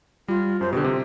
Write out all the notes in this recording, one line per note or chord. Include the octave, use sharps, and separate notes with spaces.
G3 F4
F#2 C5
B2 D3 G4
C3